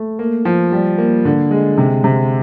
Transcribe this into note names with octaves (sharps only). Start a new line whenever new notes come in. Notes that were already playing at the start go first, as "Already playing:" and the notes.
Already playing: A3
A#3
F3
G3
A#3
D3
G#3
C3
C3